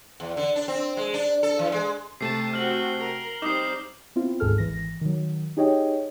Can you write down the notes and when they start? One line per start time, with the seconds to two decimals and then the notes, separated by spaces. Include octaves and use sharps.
0.20 E2
0.37 D3
0.56 D4
0.68 C4
0.97 G#3
1.14 D4
1.43 A4
1.59 E3
1.72 G#3
2.21 C3 A3 A5 C7
2.53 C4 F#4 F6 F#7
3.00 A#4
3.42 G3 C4 D#4 C5 D6 D#6 C7
4.16 B3 C4 E4 F4
4.40 G#1 D2 G#2 G#4 A4 F6
4.58 G#1 E3 A#6
5.01 D#3 F#3
5.57 D#4 G4 G#4 C#5 D#5 G5